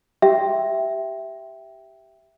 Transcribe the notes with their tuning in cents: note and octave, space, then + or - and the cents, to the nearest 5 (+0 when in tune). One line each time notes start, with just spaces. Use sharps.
G4 -10 E5 +0 G5 +0